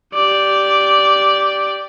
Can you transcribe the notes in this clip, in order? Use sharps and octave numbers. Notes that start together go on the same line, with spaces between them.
G4 D5